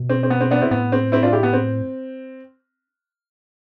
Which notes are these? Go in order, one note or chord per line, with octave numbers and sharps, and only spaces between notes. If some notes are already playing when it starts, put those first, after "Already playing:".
Already playing: B2
C4
C4
B3
C4
B3 D4
C4 E4
A2 B3
C4
C4 E4
D4 F4
E4 G4
B3
C4